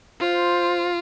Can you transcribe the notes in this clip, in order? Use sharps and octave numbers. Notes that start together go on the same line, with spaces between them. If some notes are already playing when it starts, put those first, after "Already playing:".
F4 C5